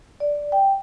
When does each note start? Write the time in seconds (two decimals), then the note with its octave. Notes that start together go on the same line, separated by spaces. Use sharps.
0.20 D5
0.52 G5